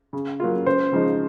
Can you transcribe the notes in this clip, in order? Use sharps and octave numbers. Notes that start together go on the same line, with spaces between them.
C#3
F#3 A#3 F4
C#2 C5
C#3 F3 G#3 D#4